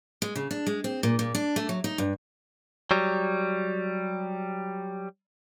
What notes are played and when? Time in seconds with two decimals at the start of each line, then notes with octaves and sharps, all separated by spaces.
0.22 G#3
0.36 C#3
0.51 D4
0.67 G#3
0.84 C4
1.03 A#2
1.19 A#2
1.35 D4
1.56 A3
1.69 F#3
1.84 D#4
1.98 G2
2.91 F#3 G3